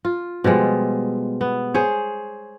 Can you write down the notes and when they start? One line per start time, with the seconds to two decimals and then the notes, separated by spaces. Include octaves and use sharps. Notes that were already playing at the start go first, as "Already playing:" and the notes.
0.05 F4
0.44 B2 F3 G3 G#3
1.41 B3
1.74 G#4 C5 C#5